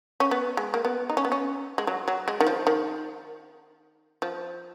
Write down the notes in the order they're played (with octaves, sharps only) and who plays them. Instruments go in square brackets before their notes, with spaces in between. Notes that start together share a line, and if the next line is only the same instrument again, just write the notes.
[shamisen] C#4
B3
G#3
A#3
B3
D#4
C#4
B3
C#4
G#3
F#3
F#3
G#3
D#3
F3
D#3
F3